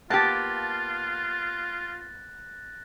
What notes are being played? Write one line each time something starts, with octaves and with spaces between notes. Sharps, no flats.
A#3 B3 F4 G4 A5 F#6 A6 A#6